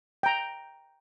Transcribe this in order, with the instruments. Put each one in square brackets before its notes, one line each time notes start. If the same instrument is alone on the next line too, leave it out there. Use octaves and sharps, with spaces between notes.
[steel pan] G5 A#5